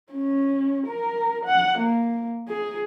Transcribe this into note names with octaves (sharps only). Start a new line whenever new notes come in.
C#4
A#4
F#5
A#3
G#4